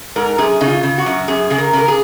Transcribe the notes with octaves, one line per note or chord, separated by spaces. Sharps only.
G#2 A#4
F#2 G#4
C#3 D#4
F4
C#3
F#4
F#2
F#2 G#4
C#3 G#4
A#4
C#3 A#4
G#4